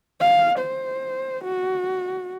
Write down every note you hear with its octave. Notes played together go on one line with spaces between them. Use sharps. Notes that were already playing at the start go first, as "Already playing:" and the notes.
F5
C5
F#4